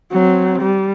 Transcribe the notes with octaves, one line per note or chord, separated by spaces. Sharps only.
F#3 C4
G3